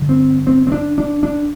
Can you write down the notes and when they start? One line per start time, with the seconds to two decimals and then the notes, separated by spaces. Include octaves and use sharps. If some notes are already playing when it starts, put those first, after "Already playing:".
Already playing: G2 D3
0.09 C4
0.47 C4
0.67 C4
0.72 D4
0.98 D4
1.23 D4